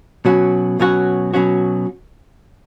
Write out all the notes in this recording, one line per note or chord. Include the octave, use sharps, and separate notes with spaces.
B2 F#3 C#4 F#4
B2 F#3 C#4 F#4
B2 F#3 C#4 F#4